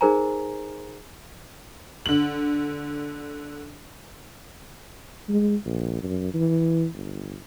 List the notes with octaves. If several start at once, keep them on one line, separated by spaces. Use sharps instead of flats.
D#4 G#4 A#4 C5 G#5 A#5
D3 F#7
G#3
A#1
F#2
E3
G1